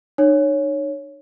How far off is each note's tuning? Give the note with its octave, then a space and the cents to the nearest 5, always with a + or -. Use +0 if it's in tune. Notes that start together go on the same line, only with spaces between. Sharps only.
D#4 -40 C#5 +0